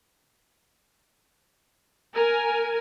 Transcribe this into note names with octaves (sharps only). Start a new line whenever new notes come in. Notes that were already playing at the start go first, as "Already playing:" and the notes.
A#4 G#5